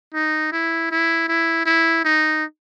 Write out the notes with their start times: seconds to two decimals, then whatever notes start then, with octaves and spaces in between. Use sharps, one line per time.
0.14 D#4
0.52 E4
0.91 E4
1.28 E4
1.66 E4
2.05 D#4